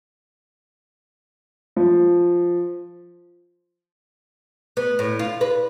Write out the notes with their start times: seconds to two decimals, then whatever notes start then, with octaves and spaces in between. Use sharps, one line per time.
1.76 F3
4.77 B3
4.99 A2
5.19 F4
5.41 B4